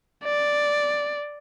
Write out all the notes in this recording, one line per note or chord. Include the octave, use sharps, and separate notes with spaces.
D5